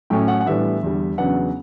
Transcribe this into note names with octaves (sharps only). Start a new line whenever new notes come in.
A2 F#3 A3 C#4 G5
F#5
F#5
A2 E3 G3 B3 D4 E5
E2 D3 G3
E2 C#3 F#3 B3 D4 F#5